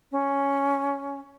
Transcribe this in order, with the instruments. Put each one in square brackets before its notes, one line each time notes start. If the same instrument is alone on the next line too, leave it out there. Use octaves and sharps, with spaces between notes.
[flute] C#4